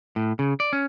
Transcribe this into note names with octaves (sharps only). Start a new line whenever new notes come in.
A2
C#3
D5
C#4